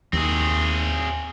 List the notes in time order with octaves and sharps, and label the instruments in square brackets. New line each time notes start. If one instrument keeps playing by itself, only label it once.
[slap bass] D#2 [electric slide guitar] C4 G#4